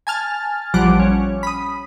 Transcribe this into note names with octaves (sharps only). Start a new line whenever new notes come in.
G#5 A5 F6
A#1 F3 G3 F#5 D6
C#4
B5 D#6